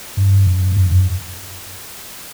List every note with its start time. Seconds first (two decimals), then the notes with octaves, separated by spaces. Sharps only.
0.17 G2
0.47 F#2
0.72 G2
0.77 F#2
0.86 F2
0.91 F#2